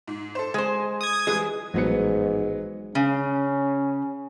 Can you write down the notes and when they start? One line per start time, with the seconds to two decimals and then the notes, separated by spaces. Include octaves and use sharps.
0.08 G#2
0.35 A4 C5
0.54 G#3 C5 G#5
1.01 D#6 G#6
1.27 E3 G3 G#3 G#4
1.74 A1 G#2 F3 F#3 B3 C#7
2.95 C#3 C#4